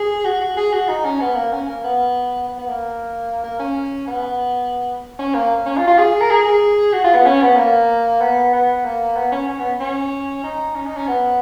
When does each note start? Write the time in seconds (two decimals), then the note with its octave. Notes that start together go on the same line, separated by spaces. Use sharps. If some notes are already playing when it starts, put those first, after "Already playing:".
Already playing: G#4
0.25 F#4
0.41 F#4
0.57 G#4
0.73 F#4
0.89 D#4
1.05 C#4
1.20 B3
1.36 A#3
1.52 C#4
1.68 A#3
1.84 B3
2.48 B3
2.58 B3
2.69 A#3
3.44 A#3
3.59 C#4
4.07 B3
5.19 C#4
5.34 A#3
5.66 C#4
5.77 F4
5.87 F4
5.99 G#4
6.21 A#4
6.30 G#4
6.93 F#4
7.04 F4
7.15 B3
7.25 C#4
7.41 B3
7.57 A#3
8.21 B3
8.53 B3
8.85 A#3
9.16 B3
9.32 C#4
9.49 C#4
9.59 B3
9.80 C#4
10.44 D#4
10.75 C#4
10.87 D#4
10.97 C#4
11.08 B3